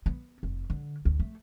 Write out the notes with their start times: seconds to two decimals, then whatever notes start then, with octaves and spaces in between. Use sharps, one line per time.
0.06 B3
0.43 F1
0.70 D3
1.05 D2
1.20 A3